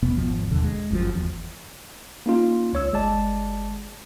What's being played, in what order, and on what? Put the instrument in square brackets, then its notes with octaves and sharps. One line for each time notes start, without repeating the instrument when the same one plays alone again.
[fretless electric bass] E1 B2 B3
G#1 F2 F3 B3
F#1 D#2 B2 D3
G#3
G1 F#2 C#3 F3
F#1 E2
[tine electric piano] A#3 C#4 D#4 F4
C#2 C#5 E6
G1 G#3 D5 A5